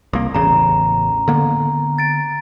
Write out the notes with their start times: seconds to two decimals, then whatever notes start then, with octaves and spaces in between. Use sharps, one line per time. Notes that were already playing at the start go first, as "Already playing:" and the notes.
0.13 C2 A#3
0.34 A1 E2 C#3 A#5
1.28 D3 A#3 B3
1.98 A6 D7